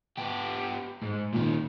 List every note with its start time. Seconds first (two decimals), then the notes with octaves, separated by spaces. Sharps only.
0.17 B3 G4
1.02 G#2
1.33 A#2 D#3